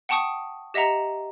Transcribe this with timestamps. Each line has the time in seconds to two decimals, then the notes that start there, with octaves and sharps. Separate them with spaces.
0.09 F#5 G5 A5 C#6 D#6
0.74 G4 D#5 E5 F#5 A#5